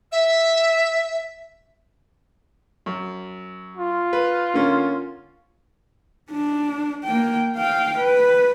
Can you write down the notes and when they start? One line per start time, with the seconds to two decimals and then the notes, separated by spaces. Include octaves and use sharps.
0.11 E5
2.86 F#2
3.77 F4
4.13 B4
4.54 D3 A#3 C#4
6.31 D4
7.04 A#3 G5
7.56 F5 G5
7.98 B4